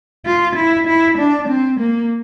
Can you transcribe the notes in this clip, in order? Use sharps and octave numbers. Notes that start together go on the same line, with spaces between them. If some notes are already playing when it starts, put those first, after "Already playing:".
F4
E4
E4
D4
C4
A#3